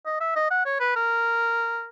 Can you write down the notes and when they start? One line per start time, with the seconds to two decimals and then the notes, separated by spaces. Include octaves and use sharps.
0.06 D#5
0.20 E5
0.35 D#5
0.50 F#5
0.65 C#5
0.80 B4
0.96 A#4